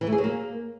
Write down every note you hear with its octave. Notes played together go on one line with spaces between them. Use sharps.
E3
A3
G#4
F#3
A#3